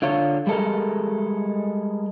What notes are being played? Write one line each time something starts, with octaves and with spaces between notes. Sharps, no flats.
D3 F4 C#5
G3 G#3 A4 A#4